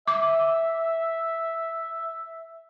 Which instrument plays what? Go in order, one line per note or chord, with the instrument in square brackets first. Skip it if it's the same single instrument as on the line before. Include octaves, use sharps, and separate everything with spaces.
[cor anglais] E5 [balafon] D6